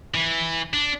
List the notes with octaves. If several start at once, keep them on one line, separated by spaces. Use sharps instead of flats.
E3
D4